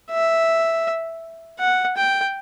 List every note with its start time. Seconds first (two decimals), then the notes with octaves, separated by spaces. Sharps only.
0.11 E5
1.59 F#5
1.97 G5